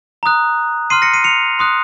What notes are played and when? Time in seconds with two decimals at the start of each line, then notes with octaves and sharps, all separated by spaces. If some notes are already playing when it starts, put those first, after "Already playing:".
0.23 A#5 D#6 F#6
0.90 C6 F6 C7 D#7
1.02 A#6 C#7
1.13 C7 D#7
1.24 C#7 F7
1.59 C6 D#6 F#6